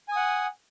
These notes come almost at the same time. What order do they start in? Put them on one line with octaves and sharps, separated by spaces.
G#5 D#6 F#5